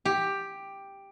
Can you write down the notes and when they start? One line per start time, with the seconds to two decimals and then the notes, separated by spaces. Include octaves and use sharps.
0.05 G4